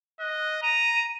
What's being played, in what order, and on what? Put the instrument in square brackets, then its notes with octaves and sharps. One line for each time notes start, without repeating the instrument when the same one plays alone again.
[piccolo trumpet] D#5 [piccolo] F#6
[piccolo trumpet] A#5 [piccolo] D#7